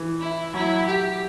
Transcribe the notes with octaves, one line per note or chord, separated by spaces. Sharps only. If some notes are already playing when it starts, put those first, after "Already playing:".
Already playing: E3
E4
F#3 E4
G4